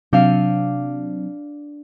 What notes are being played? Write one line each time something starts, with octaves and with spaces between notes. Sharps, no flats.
C3 F#3 C4 D4 F5 D#7